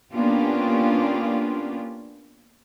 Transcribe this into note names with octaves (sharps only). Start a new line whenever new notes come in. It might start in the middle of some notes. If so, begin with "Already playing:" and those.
A#3 B3 C#4 D4 F4 G4